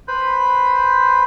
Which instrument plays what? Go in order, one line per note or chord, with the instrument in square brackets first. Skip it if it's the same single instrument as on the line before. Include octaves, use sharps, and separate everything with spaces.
[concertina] B4 C5 B5